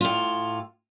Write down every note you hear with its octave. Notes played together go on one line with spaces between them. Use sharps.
A2 F4